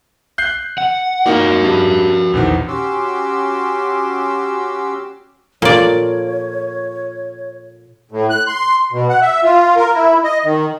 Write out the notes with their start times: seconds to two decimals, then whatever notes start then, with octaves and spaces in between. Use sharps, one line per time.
0.38 F#6 G6 C7
0.78 F#5
1.26 A#3 D#4 F#4 A#4
1.63 G2 G3
2.33 A#1 E2 D#3
2.68 C#4 F#4 G4 C6 D6 E6
5.62 A#2 F4 A4 A#4 C#5 D5
8.11 A2
8.30 F#6
8.47 C6
8.92 B2
9.09 F#5
9.21 E5
9.44 F4
9.76 A#4
9.95 E4
10.24 D#5
10.45 D#3